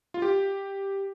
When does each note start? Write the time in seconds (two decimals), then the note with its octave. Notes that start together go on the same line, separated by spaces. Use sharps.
0.14 F4
0.22 G4